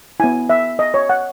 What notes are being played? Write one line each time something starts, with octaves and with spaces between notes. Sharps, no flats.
B3 E4 G#5
E5
D#5
C#5
F#5